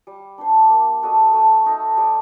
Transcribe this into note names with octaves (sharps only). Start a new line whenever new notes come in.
G3
D4 G4 C5
A#3
F#4 A4 D#5
A3
D#4 A4
G3